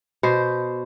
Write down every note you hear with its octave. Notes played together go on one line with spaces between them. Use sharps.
B2 C5